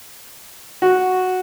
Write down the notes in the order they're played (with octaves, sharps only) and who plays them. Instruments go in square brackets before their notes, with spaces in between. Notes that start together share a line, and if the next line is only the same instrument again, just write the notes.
[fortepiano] F#4